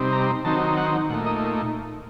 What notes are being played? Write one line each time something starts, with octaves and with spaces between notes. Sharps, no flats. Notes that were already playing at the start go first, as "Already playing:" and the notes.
Already playing: C3 G3 C4 D#4
A#5
D#3 F#3 C4 D#4 A5
F#5
A#2 A3 D#4 F#5
D#5